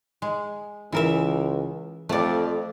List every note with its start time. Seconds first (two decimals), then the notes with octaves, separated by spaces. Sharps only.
0.22 G#3
0.92 C#2 E3 A#4 E5
2.09 F2 A3 D5